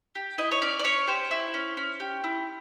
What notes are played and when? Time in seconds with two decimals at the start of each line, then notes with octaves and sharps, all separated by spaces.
0.15 G4
0.38 E4 D#5
0.51 C#5
0.62 C#4 D5
0.79 D5
0.84 C#4 C#5
1.07 G4 C5
1.31 E4
1.54 C#4
1.77 C#4
2.00 G4
2.24 E4